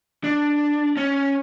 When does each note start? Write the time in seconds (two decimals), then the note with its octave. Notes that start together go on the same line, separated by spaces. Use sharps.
0.24 D4
0.97 C#4